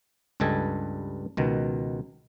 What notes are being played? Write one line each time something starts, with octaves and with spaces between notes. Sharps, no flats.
C#2 G2 G3 A4 D#5 G#5
C#2 B2 D#3